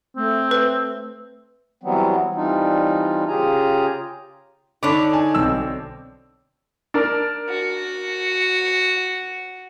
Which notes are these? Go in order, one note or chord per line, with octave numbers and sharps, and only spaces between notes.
A3 C4
B4
E3 F#3 G3 B3 C4
E3 G3 C4 D4 D#4 F4
C#3 F4 G4 G#4 G#5 A#5
D3 D4 D#4 C#5 A5 B5 D6
G#5 A5
B1 C4 E6
D4 A#4
F#4